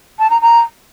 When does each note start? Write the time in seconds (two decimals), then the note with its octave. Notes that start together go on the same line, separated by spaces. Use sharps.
0.19 A5
0.30 A#5
0.41 A#5